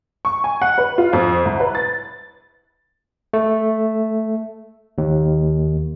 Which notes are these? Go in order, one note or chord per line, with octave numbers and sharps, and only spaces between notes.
C#6
G#5
F#5
B4
F4
F2
C2
B4
A6
A3
D#2